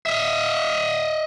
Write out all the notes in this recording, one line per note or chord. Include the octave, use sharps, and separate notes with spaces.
D#5 E5